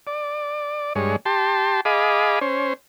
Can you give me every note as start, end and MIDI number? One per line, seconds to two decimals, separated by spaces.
0.07 0.93 74
0.95 1.16 43
0.95 1.16 56
0.95 1.16 73
1.26 1.81 67
1.26 1.81 81
1.26 1.81 84
1.85 2.39 68
1.85 2.39 75
1.85 2.39 77
1.85 2.39 83
1.85 2.39 86
2.41 2.73 61
2.41 2.73 72